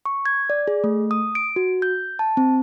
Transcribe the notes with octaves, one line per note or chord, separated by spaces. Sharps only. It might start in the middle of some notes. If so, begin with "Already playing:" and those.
C#6
G#6
D5
G#4
A3
D#6
D7
F#4
G6
A5
C4